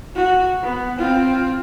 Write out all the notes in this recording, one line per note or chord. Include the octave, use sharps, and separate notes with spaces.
F#4
B3
C4 F4